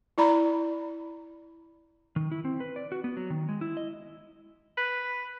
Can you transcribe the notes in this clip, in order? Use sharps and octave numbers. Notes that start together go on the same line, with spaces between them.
E4 D5 A#5 B5
D#3
E4
C4
B4
D5
F#4
B3
F#3
D#3
G#3
E4
D#5
B4